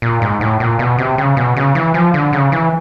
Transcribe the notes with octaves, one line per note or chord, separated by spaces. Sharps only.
A#2
G#2
A2
A#2
B2
C3
C#3
B2
C#3
E3
F3
D3
C#3
E3